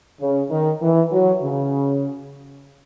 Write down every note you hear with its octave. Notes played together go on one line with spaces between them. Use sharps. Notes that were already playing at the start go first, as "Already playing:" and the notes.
C#3
D#3
E3
F#3
C#3